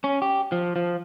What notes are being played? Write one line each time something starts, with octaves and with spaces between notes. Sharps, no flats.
C#4
G4
F3
F3